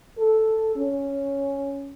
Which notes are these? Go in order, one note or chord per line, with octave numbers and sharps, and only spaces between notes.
A4
C#4